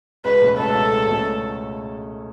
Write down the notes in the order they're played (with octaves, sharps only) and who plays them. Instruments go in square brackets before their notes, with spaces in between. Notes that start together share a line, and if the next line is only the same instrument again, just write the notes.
[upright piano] C#2 [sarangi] B4
[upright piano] B2 A3 C#4
[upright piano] C#2 [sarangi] A4
[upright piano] B2 A3 C#4
C#2
B2 A3 C#4